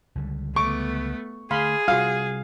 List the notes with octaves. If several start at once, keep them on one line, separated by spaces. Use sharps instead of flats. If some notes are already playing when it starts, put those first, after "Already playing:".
C#2 D3 G3
A3 B3 C#6 D6
D3 A3 G#4 F5 B5 C6
C3 G3 F4 F#4 F5